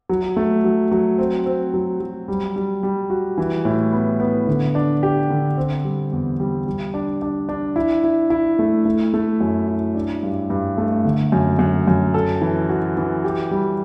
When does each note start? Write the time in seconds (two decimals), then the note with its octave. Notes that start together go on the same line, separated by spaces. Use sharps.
0.09 F#3
0.37 A3
0.64 F#3
0.91 F#3
1.18 C4
1.46 C4
1.74 F#3
2.00 F#3
2.28 G3
2.56 G3
2.83 G3
3.10 F#4
3.38 E3
3.65 A2
3.93 B3
4.20 B3
4.47 D3
4.75 D4
5.03 G4
5.30 D3
5.57 C4
5.84 G3
6.12 E2
6.40 G3
6.66 G3
6.94 D4
7.22 D4
7.49 D4
7.76 E4
8.04 E4
8.30 E4
8.59 A3
8.85 A3
9.14 A3
9.41 F#2
9.68 E4
9.95 D4
10.23 G2
10.50 G2
10.78 A3
11.05 D3
11.32 F#2
11.59 F#2
11.87 F#2
12.14 A4
12.41 E3
12.69 F#4
12.97 E3
13.24 G4
13.51 G3